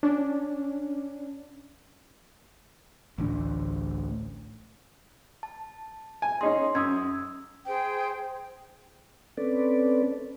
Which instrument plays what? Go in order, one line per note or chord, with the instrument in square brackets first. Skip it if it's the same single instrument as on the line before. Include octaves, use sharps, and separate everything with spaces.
[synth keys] C#4 D4
[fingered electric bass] A1 D2 D4
[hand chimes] A5
[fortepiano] G#5
[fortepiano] C#4 D#4 G#4 [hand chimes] C6
[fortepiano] F#2 [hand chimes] D#6 E6 G#6
[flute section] G#4 C5 G5
[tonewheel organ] C4 C#4 A4 B4 D5